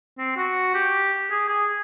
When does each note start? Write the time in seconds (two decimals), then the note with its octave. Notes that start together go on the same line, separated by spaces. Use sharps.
0.18 C4
0.37 F#4
0.75 G4
1.31 G#4
1.49 G#4